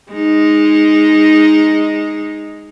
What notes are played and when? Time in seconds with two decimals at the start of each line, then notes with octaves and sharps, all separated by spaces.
0.11 G#3 D#4